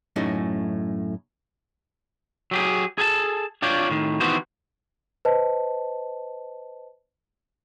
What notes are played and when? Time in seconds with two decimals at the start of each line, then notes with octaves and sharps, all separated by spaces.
0.16 F#2 A2 A3 C#4 D#4
2.51 F#3 G4 G#4
2.98 G#4 A4 G#5 A5
3.62 D4 F4 C#5 D5 G5
3.90 A2 D#3
4.20 D#3 E3 B3 F#4 G4 C5
5.25 B4 C5 D#5 A5